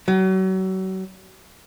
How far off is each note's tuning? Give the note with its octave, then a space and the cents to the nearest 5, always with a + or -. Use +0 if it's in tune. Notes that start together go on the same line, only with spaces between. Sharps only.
F#3 +35